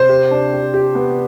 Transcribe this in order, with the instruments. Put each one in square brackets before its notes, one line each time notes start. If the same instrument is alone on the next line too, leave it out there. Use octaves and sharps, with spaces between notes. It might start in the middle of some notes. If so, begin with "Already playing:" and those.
Already playing: [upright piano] C3 [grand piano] C5
[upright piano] G4
D4
G4
G4
B3